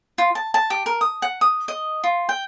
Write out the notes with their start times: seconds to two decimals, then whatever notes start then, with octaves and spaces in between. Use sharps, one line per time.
0.18 F4
0.35 A5
0.54 A5
0.70 G4
0.86 A#4
1.01 D#6
1.22 F#5
1.41 D#6
1.68 D#5
2.04 F4
2.29 G5